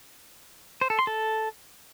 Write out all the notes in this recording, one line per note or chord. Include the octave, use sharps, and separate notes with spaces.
C5
A4
C6
A4